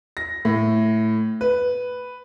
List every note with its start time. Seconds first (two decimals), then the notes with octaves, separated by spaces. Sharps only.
0.17 A#6
0.45 A2
1.41 B4